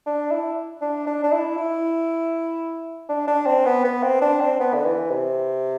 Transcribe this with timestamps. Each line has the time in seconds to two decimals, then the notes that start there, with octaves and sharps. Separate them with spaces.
0.06 D4
0.31 E4
0.82 D4
1.07 D4
1.24 D4
1.32 E4
1.57 E4
3.09 D4
3.27 D4
3.46 C4
3.65 B3
3.84 B3
4.03 C4
4.21 D4
4.41 C4
4.60 B3
4.74 D3
4.85 E3
5.10 C3